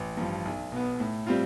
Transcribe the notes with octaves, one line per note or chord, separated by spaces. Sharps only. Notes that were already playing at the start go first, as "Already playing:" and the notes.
Already playing: A1
G2 F3
B1
B2 B3
A2
G3 C4 F4